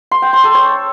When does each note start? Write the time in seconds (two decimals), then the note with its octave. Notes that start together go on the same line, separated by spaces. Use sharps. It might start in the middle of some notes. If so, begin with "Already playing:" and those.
0.11 C6
0.22 G5
0.33 C6
0.44 A4
0.55 C#5